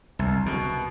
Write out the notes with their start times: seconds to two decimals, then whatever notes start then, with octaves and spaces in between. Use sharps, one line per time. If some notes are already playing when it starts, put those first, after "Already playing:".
0.19 C2
0.46 B2